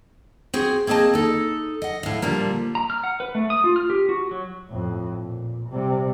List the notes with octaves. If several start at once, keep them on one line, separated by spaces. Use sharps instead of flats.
C4 F#4 G#4
A#3 C4 G#4 D#5 A5
D#4 A4
D#5 F#5
A2 F5
A#2 D3 F3 G3 A#3
A#5
F6
F#5
B4
A3
D#6
F4
F6
G4
F#4
F#3
F2 A2
A#2
C3 G3